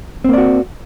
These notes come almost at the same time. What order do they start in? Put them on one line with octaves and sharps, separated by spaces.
C4 A#3 D5 F#4